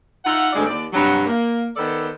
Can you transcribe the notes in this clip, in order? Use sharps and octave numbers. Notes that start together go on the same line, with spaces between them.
D#4 F4 E5 F#5
D2 G2 G#3 C4 D5
D#2 D5
G2 C3 F#3
A#3
D#3 B3 A4 C5 D5